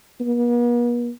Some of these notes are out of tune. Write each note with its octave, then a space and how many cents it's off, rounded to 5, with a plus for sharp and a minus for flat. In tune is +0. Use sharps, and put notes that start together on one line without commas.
B3 -45